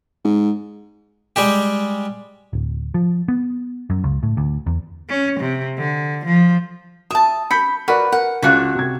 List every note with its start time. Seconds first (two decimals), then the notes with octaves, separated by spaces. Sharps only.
0.24 G#2
1.36 G3 G#3 G4
2.53 D1
2.94 F3
3.28 B3
3.90 F#2
4.04 C#2
4.23 A2
4.37 D2
4.66 E2
5.09 C#4
5.40 C3
5.78 D3
6.25 F3
7.11 E5 A5 D#6
7.51 B5 G6 B6 C#7
7.88 F#4 A#4 B4 D5
8.12 A#4 F#5
8.42 C#2 C#3 D4 F#4
8.75 C3 G#6